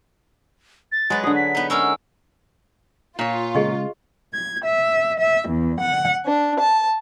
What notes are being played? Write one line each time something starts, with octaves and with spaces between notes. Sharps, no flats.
A6
F#3 G#3 B4
D3 G#4 D#6
B6
B3 D#4
G#3 C#4 A#4 E6
A#2 F4 C#5
C#3 G#3 G#4 D#5 C#6
G#6
E5
E5
E2
F#5
D4
A5